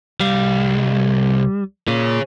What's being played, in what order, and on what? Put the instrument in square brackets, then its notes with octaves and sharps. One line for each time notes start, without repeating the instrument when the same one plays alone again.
[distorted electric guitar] C2 F5 [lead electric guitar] G3
[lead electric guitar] A#2 [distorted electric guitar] G#4 C#5